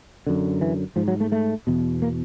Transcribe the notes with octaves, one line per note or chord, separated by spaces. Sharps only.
F#2 D3
E3
G#2 F3
F#3
A3
A3
E2 B2
A#3